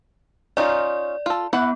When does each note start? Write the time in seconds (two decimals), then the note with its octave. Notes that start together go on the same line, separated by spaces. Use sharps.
0.57 C#4 D#4 F4 D5
1.26 F4 A4
1.53 B3 E4 B4 F#5